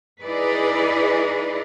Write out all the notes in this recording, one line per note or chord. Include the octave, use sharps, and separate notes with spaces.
D#4 E4 G#4 B4 D5